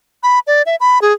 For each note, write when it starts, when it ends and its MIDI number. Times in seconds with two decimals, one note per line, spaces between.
0.23 0.39 83
0.47 0.62 74
0.66 0.76 76
0.80 1.01 83
1.02 1.13 68